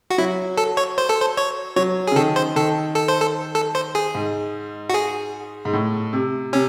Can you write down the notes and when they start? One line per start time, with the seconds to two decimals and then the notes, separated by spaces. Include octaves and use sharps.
0.10 F#4
0.18 F#3 E4
0.57 A4
0.77 C#5
0.98 C5
1.09 A4
1.20 C5
1.37 C#5
1.76 F#3 C#5
2.08 C#3 G#4
2.16 D#3 A4
2.36 C5
2.56 D#3 A4
2.95 A4
3.08 C5
3.21 A4
3.55 A4
3.75 C5
3.95 G#4
4.15 G#2
4.89 F#4
4.94 G#4
5.65 G#2
5.73 A2
6.13 C3
6.53 C3 C#4